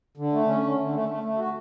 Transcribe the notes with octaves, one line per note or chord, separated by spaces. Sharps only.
D3
A3
C#4
D3
D3
A3
A3
A3
F#4